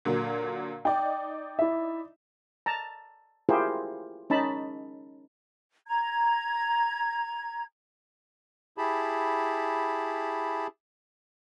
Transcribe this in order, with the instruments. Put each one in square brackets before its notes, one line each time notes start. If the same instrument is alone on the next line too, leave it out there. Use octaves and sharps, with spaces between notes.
[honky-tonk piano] A#2 D3 F#3
[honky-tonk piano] D#4 D5 [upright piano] G5
[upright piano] E4 E5
[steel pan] A5 A#5
E4 F4 G4 G#4 A#4 C5
C#4 D#4 A5 B5
[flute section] A#5 G#6
[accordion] E4 G4 G#4 A5 B5